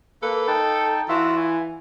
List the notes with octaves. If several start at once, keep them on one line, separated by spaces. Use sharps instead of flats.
A#3 A4 B4
D#4 G5 A5
E3 F4 F#4 E6
G#5